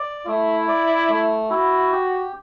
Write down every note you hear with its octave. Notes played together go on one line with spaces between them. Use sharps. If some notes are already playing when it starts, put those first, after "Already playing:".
Already playing: D5
A3 E4
D5
A3
E4 F#4
G4